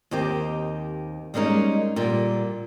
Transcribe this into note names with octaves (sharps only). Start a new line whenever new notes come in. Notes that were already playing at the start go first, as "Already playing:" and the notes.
D#2 D#3 C4 G4
G3 G#3 A#3 C#4 D#4
A#2 D3 G3